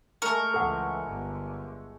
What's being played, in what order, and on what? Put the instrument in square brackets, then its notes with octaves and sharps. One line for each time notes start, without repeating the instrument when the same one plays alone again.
[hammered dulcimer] G#3 A3 C#6 [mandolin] A#4
[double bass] C#2 E3 [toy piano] A4 F#5
[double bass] G1 D3